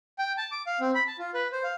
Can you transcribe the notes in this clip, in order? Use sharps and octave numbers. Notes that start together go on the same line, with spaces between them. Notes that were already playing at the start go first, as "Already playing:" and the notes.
G5
A5
D6
F5
C4
B5
A5
F4
B4
C5
F5